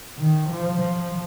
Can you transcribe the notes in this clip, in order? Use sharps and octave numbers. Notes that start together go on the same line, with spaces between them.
D#3
F3
F3